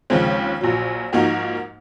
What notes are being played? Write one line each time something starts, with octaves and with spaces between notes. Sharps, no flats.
D#2 C#3 F3 G#3 C4
A#1 A#2 F#3
G#2 F3 A#3 D#4 F#4